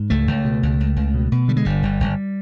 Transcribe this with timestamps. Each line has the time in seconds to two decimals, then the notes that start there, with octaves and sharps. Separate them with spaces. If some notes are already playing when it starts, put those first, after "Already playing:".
Already playing: G#2
0.10 C#2 A3
0.27 C#2
0.45 B2
0.63 C#2
0.80 C#2
0.96 C#2
1.14 B2
1.32 B2
1.48 D3 G3
1.57 G#3
1.65 G1 G3
1.83 G1
2.00 G1